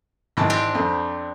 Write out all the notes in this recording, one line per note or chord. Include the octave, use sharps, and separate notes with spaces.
G#1 E3 A5
C4 D4 G4
F2